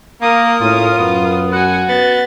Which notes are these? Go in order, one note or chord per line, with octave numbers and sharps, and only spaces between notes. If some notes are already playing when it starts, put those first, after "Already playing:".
A#3 A#4 D#6
A2 C#4 F4
F#2 B3
F#4 F#5 G#5
B3 A6